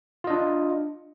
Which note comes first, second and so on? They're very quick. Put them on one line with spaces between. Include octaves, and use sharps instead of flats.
F4 D#5 D4